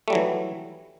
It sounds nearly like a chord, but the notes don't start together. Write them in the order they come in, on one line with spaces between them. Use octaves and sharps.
A3 G3 F#3 E3